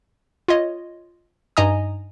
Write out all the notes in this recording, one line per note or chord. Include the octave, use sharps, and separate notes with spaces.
F4 C#5 D#5
G2 D#4 D#5 G#5 A#5 D#6